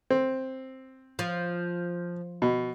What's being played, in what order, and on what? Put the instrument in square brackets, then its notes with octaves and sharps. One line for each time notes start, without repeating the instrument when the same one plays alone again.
[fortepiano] C4
[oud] F3
[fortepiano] B2